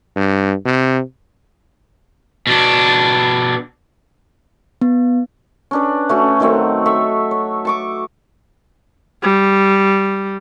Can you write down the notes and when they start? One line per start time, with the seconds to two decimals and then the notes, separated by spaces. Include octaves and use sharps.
0.16 G2
0.66 C3
2.47 B2 D4
4.82 B3
5.71 C#4 D4 B4
6.09 A3 C#4 F#4
6.40 D#3 F#3 A3 C4
6.86 A4 E5 C#6
7.31 C#5
7.65 A5 C#6 D6
9.23 G3